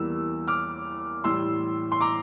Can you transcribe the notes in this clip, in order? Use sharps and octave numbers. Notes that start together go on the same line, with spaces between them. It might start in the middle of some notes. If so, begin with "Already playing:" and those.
Already playing: E2 E3 G3 A#3 E6
D6 F6
A2 E3 G3 C6 E6
C6
A#5 D6